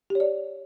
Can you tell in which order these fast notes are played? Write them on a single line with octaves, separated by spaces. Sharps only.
G4 C#5 D5